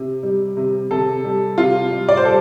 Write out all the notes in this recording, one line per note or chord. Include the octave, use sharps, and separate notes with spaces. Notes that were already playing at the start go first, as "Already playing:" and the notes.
Already playing: C3
G3
C3
C3 A4
G3
C3 F4
G3
D5
C5
G3 A4